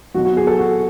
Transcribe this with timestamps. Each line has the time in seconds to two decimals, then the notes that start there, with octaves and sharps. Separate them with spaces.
0.14 B1 B2 F#3 F#4
0.25 F#4
0.37 G#4
0.47 A4
0.58 F#4